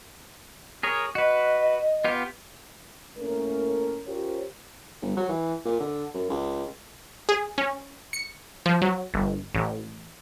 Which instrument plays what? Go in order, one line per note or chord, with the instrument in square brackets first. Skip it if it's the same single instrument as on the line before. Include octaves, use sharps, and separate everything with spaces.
[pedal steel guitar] G#4 A#4 C#5 [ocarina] D#6
[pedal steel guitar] F#4 B4 [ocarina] D#5
[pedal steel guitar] B3 F4 G4
[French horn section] A2 A3 A#3 C#4 A#4
C#4 F4 G4 A#4 C5 C#5
[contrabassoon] G1
F#3
E3
A#2
D3
F#2
C#2
[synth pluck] G#4
C#4
C#7
F3
F#3
G1
A1